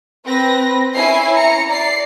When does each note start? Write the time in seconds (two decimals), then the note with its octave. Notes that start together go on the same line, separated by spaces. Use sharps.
0.25 C4 B4 A#6
0.94 C#4 E4 G#5 C7
1.35 A#5 C#7
1.69 D5 C7